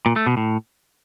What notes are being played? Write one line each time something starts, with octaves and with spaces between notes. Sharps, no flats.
A#2
A3
B2
A2